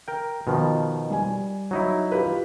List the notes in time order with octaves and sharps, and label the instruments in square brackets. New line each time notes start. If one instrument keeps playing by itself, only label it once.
[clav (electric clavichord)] A#4 G5
B2 D#3 F3
[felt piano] G3 G#5
[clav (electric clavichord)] F#3 D#4 E4
[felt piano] F4 G4 B4